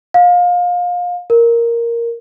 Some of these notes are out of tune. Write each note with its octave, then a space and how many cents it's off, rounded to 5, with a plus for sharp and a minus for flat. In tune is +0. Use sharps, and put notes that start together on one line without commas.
F5 +30
A#4 +0